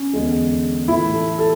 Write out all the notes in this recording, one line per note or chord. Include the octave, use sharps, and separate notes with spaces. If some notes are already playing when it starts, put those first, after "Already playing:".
Already playing: C#4
E2 D3 G#3
A2 E3 A3 E4
A4
A4